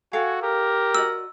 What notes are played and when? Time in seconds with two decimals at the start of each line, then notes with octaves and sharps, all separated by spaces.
0.13 F#4 A4 F5 G5 G#5
0.43 G4 A#4
0.95 F#4 D5 D#5 E6